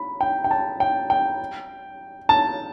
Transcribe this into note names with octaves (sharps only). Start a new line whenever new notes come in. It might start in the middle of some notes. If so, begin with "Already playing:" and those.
Already playing: B5
G5
G5
A5
G5
G5
A5